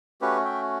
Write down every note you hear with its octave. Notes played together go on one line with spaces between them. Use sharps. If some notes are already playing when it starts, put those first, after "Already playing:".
A3 C#4 F#4 G4 B4
E5 G5